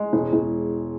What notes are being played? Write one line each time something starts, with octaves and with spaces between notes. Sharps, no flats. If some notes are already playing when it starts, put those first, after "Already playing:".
Already playing: G#3
E1
E1